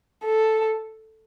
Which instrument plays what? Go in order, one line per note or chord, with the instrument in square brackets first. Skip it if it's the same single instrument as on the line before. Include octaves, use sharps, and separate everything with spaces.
[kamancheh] A4